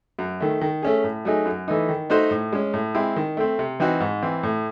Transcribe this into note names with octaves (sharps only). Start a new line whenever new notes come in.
F#2
D#3 A3
D#3
A3 C#4 G#4
A2
F#3 A3 D#4 G#4
F#2
E3 A3 D#4
D#3
A3 D#4 F#4 C5
A2
G#3 C#4
A2
G#3 C4 E4
D#3
A3 C4
C3
E3 C4 D#4 F#4
G#2
E3 C4
A2